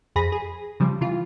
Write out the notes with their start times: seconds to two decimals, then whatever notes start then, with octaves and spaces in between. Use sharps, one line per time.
0.16 F2 G#4 B5 A#6
0.32 G#4
0.80 C#3 F3 G3
1.01 C3 E3 F4